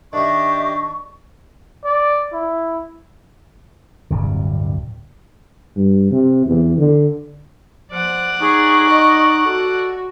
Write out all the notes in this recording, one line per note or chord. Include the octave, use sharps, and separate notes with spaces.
D#3 D4 D#4 G4 D#5 E5 C#6
D5
E4
D1 G2 C3
G2
C3
E2
D3
F3 D5 F#5
D#4 G#4 C#6
D#5
F#4 A4